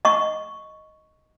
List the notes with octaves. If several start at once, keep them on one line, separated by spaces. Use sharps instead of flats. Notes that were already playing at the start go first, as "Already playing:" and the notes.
D#5 C#6